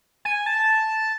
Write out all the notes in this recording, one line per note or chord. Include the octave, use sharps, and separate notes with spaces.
G#5
A5